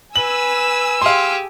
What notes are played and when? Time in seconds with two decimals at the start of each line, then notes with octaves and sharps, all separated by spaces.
0.16 B4 G#5 E6 F#7
1.02 G4 G#4 F5 C6